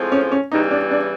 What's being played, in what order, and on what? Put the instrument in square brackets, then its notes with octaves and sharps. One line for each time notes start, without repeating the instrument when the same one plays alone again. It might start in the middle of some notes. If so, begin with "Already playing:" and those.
Already playing: [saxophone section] A2 F3 G#3 C4
[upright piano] C#4
C#4
[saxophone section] E2 C#3 E3 G3 [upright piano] D#4
[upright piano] D4
D4